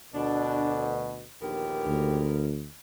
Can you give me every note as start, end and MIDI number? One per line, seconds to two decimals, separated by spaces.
0.14 1.27 38
0.14 1.27 47
0.14 0.93 62
1.42 2.28 34
1.42 2.28 39
1.42 2.49 50
1.42 2.49 59
1.42 2.28 67
1.42 2.49 70
1.86 2.67 38